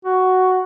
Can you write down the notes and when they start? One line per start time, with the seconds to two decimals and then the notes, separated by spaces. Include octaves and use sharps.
0.05 F#4